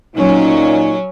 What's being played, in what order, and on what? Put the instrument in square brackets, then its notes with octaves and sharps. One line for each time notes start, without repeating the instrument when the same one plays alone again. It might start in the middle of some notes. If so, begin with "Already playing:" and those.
[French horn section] A#2 D#4 [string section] F#3 C#4